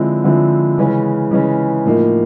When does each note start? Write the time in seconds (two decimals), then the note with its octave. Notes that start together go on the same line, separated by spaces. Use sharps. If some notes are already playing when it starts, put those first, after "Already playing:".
Already playing: D3 F3 G#3 C4 E4
0.24 D3 F3 G#3 C4 E4
0.78 C#3 E3 G#3 C#4
1.31 C#3 E3 G#3 C#4
1.85 A2 F3 A#3 D#4